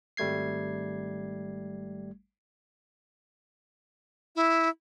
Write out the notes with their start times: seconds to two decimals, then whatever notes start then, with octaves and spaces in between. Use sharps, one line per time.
0.17 G#1 G3 A3 G#6 C7
4.36 E4